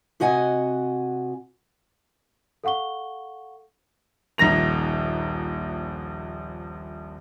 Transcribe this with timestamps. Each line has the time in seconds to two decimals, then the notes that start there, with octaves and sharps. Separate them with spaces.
0.20 C3 F#4 D#5 F#5 G#5
2.64 A4 F5 F#5 C#6 G7
4.38 D#1 A#1 A#5 A#6 F7